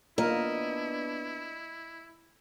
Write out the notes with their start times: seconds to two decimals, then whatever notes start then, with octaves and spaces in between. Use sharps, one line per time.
0.18 A#3 B3 D4 E4 F4 A#4 D#5